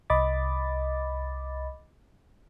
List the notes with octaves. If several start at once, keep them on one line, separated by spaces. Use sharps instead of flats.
C2 D#5 B5 D6 A6